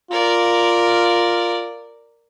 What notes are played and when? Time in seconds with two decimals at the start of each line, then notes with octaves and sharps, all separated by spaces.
0.11 F4 A#4 D5